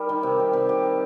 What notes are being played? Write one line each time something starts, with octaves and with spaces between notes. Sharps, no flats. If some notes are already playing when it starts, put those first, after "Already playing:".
Already playing: G3 D#4 A#4
D#3
C3
G3
C3
G4
A#4